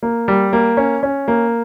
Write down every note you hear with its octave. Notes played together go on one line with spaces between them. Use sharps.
A#3
G3
A#3
C#4
C#4
A#3